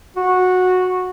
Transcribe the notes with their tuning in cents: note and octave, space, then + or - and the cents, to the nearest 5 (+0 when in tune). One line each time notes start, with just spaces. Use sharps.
F#4 -10